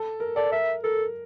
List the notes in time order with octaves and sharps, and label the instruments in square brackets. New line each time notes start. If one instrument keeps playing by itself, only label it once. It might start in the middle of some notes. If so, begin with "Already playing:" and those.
Already playing: [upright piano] A4
A#4
[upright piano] A4 [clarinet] D5
[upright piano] A#4 [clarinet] E5
[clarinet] A4 [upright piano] A#4